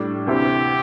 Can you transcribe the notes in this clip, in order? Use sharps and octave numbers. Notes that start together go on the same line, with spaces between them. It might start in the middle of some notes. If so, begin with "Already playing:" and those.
Already playing: A2 G3 D4
D2 C3 E3 C4 E4 G4